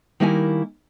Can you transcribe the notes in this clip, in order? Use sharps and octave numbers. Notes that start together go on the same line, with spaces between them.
D#3 G3 A#3 E4 F5 G#5